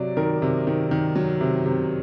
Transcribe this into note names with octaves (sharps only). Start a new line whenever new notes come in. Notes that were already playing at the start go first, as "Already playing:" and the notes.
Already playing: C3 F#3 D5
D#3 A#4
C3
D#3
D#3
F#3
C3
C3